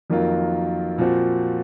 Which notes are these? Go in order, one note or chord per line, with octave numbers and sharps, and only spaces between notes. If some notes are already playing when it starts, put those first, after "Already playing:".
F2 D#3 F#3 A#3 F4
A#2 F3 C4 F#4